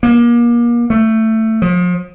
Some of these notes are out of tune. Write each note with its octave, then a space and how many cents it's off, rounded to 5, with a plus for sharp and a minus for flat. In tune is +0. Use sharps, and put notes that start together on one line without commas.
A#3 +30
A3 +15
F3 +35